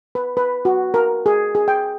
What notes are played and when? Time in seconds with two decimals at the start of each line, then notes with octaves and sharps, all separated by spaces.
0.15 B4
0.37 B4
0.65 F#4
0.94 A#4
1.26 G#4
1.55 G#4
1.68 G5